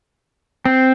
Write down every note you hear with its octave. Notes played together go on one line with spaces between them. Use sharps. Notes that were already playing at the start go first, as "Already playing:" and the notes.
C4